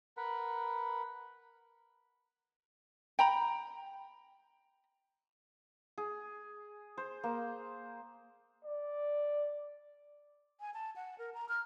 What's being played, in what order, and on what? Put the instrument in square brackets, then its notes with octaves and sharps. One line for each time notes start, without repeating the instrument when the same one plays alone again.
[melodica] A#4 B4 F#5 B5
[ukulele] G5 A#5 B5
[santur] G#4
C5
A#3
[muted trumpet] D5
[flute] G#5
A5
F#5
A#4
A#5
F6